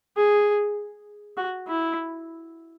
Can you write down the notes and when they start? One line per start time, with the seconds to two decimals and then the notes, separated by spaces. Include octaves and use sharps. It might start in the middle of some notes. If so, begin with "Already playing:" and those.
0.17 G#4
1.37 F#4
1.67 E4